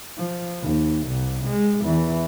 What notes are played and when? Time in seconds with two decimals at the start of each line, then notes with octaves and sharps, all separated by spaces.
0.18 F3
0.62 D#2
1.07 C2
1.46 G#3
1.82 E2 E3